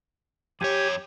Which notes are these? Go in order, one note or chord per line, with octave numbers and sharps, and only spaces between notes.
F2 G4 C#5 G#5